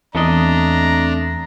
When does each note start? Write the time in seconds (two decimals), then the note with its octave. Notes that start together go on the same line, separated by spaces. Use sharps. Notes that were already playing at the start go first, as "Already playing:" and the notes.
0.15 E2 A3 C4 D4 D#5 A#5